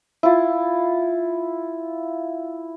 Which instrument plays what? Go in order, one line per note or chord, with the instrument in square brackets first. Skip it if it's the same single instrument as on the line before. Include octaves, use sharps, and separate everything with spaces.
[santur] E4 F4